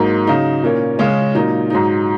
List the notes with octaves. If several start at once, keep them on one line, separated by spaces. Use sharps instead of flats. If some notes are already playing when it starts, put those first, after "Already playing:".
Already playing: G#2 F#3 A#3 D#4
C#3 F#3 D#4
A#2 A#3 C#4
C#3 G#3 C#4
A#2 F#3 D#4
G#2 F#3 D#4